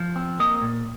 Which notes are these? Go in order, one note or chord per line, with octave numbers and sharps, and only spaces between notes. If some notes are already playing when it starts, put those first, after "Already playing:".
Already playing: F3
C4
A#3 D#5
A#2